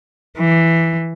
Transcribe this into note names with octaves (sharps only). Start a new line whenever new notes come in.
E3